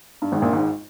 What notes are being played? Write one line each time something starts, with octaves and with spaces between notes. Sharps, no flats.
G2
G#1 G#2
A#1 A#2
G#1 G#2